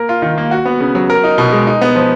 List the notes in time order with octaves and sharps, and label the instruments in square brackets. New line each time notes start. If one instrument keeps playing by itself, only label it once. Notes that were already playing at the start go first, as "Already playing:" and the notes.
Already playing: [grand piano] A#3 A#4
F4
D#3
A#3
F#4
B3
C#3
F#3
A#4
D#4
B2
G#3
D#4
B3
F3